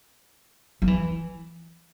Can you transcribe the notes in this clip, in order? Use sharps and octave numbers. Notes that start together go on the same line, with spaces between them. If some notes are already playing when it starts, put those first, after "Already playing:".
F3
E3